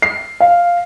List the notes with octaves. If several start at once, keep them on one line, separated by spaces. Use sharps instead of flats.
C7
F5